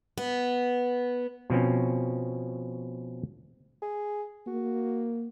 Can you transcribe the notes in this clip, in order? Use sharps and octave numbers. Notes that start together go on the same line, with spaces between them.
B3
B2 F3 C4 C#4
G#4
A#3 F#4